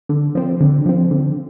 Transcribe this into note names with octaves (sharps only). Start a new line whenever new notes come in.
D3
F3 C4
D3
F3 C4
D3